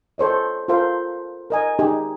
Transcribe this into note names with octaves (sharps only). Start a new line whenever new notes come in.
A4 C5 C#5 D#5
F4 A4 A#4 C5 F5
A#4 D#5 G#5
D#4 G4 G#4